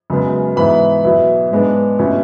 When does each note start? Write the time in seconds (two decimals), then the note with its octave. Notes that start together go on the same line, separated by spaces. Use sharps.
0.10 F#2 C#3 G#3 B3
0.56 G#2 E3 B3 E4 B5
1.04 B2 F#3 B3 E4
1.52 G#2 G#3 B3 D4
1.99 B2 A3 C#4 E4